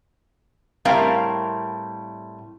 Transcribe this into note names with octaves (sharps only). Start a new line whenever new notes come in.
A2 G3 C4 A#4 F5